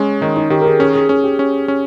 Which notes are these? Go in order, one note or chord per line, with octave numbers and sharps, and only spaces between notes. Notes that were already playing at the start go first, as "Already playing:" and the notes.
Already playing: G#3 C#4
D#3 D#4
D#4
D#3 G4
A#4
G#4
C#4 G#4
G#4
C#4 G#4
G4
C#4
C#4